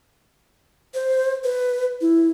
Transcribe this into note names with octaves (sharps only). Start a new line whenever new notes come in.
C5
B4
E4